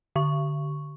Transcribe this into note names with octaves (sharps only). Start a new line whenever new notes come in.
D3 C#6